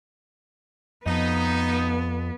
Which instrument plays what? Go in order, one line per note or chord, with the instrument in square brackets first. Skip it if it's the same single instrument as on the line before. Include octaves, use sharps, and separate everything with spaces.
[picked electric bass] F2 [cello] B3 [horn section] D#4